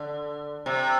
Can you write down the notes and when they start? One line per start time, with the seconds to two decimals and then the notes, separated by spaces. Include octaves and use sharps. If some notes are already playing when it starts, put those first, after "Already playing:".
Already playing: D3
0.66 C3